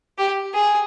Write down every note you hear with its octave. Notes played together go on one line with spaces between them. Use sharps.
G4
G#4